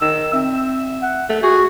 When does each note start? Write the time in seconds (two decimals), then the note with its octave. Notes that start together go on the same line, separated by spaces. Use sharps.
0.01 D#3 E6
0.33 C4 E5
1.02 F#5
1.29 A3
1.43 F#4 G#4